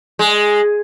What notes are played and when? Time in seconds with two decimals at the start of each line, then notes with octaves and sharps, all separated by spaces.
0.19 G#3